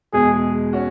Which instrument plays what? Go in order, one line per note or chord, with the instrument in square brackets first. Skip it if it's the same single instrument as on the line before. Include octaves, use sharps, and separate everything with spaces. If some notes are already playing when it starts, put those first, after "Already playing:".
[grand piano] E2 B2 G#3 [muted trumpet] G#4
[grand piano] C#4 F#4